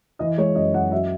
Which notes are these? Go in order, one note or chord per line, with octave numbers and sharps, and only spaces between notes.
E3 D#5
G#3 C#5
F#2 D#5
F#2 F#5
F#3 E5